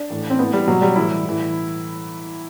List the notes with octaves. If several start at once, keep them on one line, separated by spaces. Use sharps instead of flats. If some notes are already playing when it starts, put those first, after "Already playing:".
Already playing: D4
A2 E3
C4
A2 E3 B3
G3
B2 F#3
G3
A2 E3 E4
A2 E3